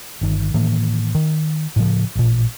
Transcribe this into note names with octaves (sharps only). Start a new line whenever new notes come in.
G1 D#3
A2 D#3 E3 A#3
D#3
A2 C#3 F3
A1 A#2